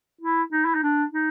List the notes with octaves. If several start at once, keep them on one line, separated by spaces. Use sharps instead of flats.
E4
D#4
E4
D#4
D4
D#4